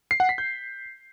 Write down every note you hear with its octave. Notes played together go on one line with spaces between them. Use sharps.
C7
F#5
B6
G6